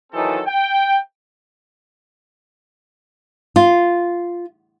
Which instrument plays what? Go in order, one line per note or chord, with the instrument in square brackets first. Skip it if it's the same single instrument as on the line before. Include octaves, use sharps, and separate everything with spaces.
[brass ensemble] D#3 E3 F#3 C4 D#4 A4
G5
[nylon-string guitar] F4